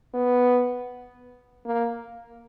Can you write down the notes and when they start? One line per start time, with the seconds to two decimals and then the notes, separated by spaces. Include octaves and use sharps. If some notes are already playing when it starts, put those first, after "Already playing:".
0.14 B3
1.66 A#3